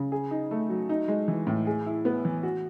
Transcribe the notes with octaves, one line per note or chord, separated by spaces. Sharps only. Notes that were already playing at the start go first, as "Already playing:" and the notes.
Already playing: C#3
G#4
D#4
A3
F#3
D#4
G#3
E3
A2
G#4
E4
B3
E3
F#4